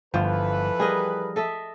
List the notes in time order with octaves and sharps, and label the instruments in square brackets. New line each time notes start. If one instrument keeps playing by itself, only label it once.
[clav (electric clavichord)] G1 [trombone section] E3 A4 B4 [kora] F3
[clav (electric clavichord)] G3 [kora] G#4 A#4 D#5
[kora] A4 D#5 E5